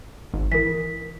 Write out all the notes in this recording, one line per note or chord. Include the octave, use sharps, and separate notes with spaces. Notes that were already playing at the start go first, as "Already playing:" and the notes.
G#1
E3 A#4 B6